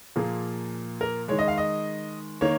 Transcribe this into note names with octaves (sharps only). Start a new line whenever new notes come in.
A#2 F3 A#3 G#4
A#4
D#3 G#3 C#5
D#5
F5
D#5
D#3 A#3 C#5